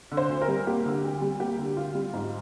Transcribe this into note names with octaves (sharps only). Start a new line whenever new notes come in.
D3
C5
D2
A#4
G3
A#3 G4
D3
D2
G3
A#3 G4
D3
D2 F4
G3
G#2